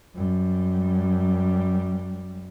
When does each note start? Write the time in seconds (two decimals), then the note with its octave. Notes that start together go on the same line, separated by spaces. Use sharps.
0.16 F#2 G3